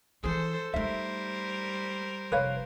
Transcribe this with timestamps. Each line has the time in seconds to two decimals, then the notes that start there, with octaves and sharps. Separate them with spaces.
0.24 E3 E4 G#4 A4 C5
0.74 G3 A3 D#4 A#4 C5 E5
2.32 F1 B4 C#5 F5